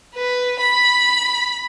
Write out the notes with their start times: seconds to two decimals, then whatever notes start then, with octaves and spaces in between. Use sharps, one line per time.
0.15 B4
0.60 B5